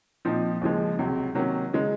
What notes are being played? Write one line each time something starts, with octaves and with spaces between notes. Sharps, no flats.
A#2 F3 C4 D#4
D#2 C#3 F3 G#3
C#2 C3 F#3
C3 D#3 F#3 A#3 C#4
C#3 G#3